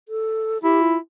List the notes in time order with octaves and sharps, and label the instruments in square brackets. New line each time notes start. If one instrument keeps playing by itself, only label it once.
[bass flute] A4
[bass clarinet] E4 [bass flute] G4
[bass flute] F4